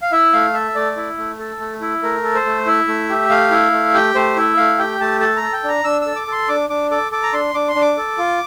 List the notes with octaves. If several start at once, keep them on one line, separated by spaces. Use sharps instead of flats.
F5
E4 E5
A3 F5
A4 E5
A3 D5
E4
A3
A4
A3
E4
A3 A#4
A4
C5
A3
E4 E5
A3
G4
A3 F5
E4
A3
G4 G5
A3 C5
E4 E5
A3 F5
G4 G5
A3 A5
A4 A5
A#5
A4
G5
D4 A#5
D4 E6
A4 E6
D6
A4 C6
D4 D6
D4 D6
A4 D6
A4 D6
A#5
D4 C6
D4 D6
C6
D4
D6
A4
F4